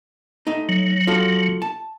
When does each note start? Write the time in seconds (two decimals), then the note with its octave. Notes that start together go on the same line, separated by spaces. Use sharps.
0.47 A3 D#4
0.69 F#3
1.07 F4 F#4 A4
1.62 A5